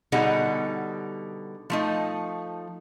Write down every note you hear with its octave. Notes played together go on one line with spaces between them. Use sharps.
B2 D3 G3 D#4 G#4 F#5
F3 A3 D#4